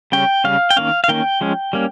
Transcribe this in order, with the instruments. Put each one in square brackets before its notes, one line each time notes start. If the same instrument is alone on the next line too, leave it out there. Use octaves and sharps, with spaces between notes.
[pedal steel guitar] C#3 G3 C#4 G5
C#3 G3 C#4 F5
G5
D#3 A#3 C#4 F5
F5
D#3 A#3 C#4 G5
F3 G#3 C#4
G3 A#3 C#4